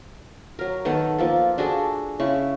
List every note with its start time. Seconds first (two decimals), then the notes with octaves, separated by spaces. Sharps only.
0.59 F#3 A#4
0.85 D#3 B3 A4 F#5
1.18 F3 A#3 A4
1.58 D4 F#4 G#4 A4
2.20 C#3 E4 C#6